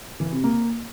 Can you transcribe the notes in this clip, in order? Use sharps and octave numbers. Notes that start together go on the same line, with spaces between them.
E3
C3
A#3